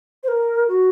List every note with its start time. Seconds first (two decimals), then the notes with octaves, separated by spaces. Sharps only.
0.23 C5
0.28 A#4
0.68 F#4